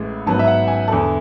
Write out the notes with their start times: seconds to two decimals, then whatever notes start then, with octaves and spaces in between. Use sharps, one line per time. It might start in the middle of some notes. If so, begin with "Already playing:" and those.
Already playing: A1 A2 G#3
0.26 G#2 F#3 B3 A5
0.39 E5
0.47 F#5
0.68 G#5
0.88 E2 D3 A3 A5